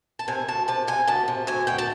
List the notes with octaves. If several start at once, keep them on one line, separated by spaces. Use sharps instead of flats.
A5
C3 G#5
D2 A5
C3 A5
C3 G#5
D2 A5
C3
D2 G#5
D2 G5
A5